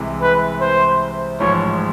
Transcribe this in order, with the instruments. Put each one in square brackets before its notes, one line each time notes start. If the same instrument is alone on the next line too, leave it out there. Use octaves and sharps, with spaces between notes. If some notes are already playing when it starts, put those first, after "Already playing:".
Already playing: [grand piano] C2 C3 E3 G#3
[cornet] B4
C5
[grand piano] A1 G#2 F3 [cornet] C#5